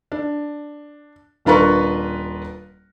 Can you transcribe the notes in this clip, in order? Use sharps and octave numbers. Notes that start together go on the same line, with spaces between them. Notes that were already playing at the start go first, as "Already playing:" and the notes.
D4
D#1 D4 F4 A#4 B4 C#6